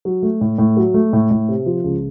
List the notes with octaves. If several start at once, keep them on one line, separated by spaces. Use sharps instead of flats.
F#3
A3
A2
A2
F#3
A3
A2
A2
C3
F3
C#2